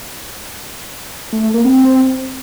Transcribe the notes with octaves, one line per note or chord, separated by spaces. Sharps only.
A3
A3
A#3
C4